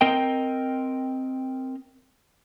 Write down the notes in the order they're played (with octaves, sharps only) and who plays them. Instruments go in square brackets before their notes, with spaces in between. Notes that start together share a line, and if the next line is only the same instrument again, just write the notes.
[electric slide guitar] C4 A#4 D#5 G5